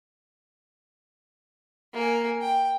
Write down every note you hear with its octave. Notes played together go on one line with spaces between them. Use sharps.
A#3 G#5
G5